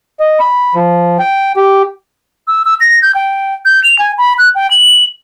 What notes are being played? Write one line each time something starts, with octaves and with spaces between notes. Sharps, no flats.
D#5
B5
F3
G5
G4
E6
E6
A#6
G6
G5
G6
F7
G#5
B5
F#6
G5
F#7